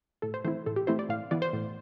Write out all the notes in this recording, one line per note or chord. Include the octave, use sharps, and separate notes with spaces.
A2 A4
C5
E3 A3 C4 E4 C5
A2 A4
G4
E3 A3 C4 E4 C5
D5
A2 F5
E3 B3 D5
C5
A2